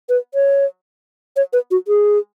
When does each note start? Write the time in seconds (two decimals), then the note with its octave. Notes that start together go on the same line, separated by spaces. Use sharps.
0.09 B4
0.34 C#5
1.36 C#5
1.53 B4
1.71 F#4
1.88 G#4